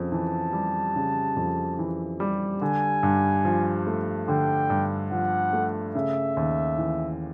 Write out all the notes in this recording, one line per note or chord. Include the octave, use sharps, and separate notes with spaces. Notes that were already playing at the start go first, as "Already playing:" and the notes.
Already playing: F2 C#3
E3 A5
G3
C#3
F2
E3
G3
D3 G#5
G2
F3
A3
D3 G5
G2
F3 F#5
A3
C#3 E5
D#2
E3